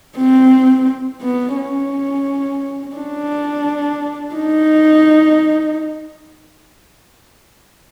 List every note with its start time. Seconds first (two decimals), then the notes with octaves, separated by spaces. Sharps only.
0.17 C4
1.22 B3
1.56 C#4
2.96 D4
4.36 D#4